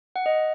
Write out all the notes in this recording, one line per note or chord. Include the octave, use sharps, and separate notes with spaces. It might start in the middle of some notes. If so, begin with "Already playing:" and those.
F#5
D#5